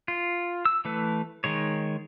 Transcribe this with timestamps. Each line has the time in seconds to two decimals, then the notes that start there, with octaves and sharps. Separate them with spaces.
0.08 F4
0.65 E6
0.85 E3 A3 B4
1.44 D#3 G#3 C#5